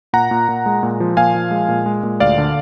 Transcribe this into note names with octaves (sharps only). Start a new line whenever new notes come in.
A#2 F#5 A#5
A#2
A#2
G#3
A#2
F3
A#2 F5 G#5
F3
G#3
A#2
G#3
A#2
D2 D5 F5
D3